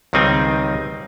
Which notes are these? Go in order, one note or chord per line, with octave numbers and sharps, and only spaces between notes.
C#2 D#3 G3 C4 D#4 G#5